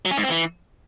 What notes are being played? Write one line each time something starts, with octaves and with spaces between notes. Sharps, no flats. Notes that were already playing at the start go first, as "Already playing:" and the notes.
F#3
C#4
G#2
C4
E3